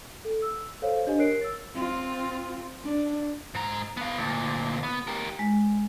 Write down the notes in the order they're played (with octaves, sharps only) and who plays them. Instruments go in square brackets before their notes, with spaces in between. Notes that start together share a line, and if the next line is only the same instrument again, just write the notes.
[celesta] A4
E6
A4 C5 C#5 F5
D4 G4 D#5 G#5
A#4 C#5 F#6 C7 D7
E6 A6
[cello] C4 F4
D4
[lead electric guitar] G#2 A#5
B3 F5
D2 A#2
B3
G4 A#4
[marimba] G#3